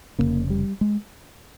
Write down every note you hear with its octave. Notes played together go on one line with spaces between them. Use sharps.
F1 F2 C#3 A#3
G3
G#3